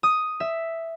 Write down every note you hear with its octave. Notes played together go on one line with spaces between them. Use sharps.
D#6
E5